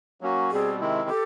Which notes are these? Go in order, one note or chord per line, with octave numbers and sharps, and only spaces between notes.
F#3 A#3 C#4 F#4
B2 G3 C4 G#4
C3 D#3 G#3 C4 E4
G4 A4